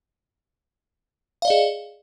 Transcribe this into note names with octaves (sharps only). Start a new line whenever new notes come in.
G#4 D5 D#5 F5